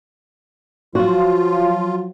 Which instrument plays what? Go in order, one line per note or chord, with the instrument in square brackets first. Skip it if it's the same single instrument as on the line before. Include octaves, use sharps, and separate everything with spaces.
[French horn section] F3 F#3 [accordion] F4 [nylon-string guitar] F#4